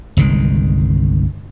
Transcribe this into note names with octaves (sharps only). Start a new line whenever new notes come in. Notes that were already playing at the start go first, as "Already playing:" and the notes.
G1 C2 D#3 G#3